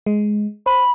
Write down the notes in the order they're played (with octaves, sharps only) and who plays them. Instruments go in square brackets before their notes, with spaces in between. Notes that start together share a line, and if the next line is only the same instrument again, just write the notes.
[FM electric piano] G#3
[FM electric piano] C5 [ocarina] B5